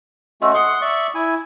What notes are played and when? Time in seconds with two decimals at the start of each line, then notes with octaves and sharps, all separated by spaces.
0.42 A3 C#4 F#4 D#5 C6 E6
0.54 F#5 C6 D#6 C#7
0.82 D5 E5 C#6
1.15 E4 G#5